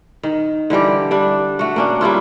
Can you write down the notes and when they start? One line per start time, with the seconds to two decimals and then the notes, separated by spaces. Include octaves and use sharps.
0.23 D#3
0.70 D3 E3 G3 G4
1.11 G3 D4
1.59 A3 F#4
1.76 A#3 C#4 D4
2.01 G3 A#3 E4 F4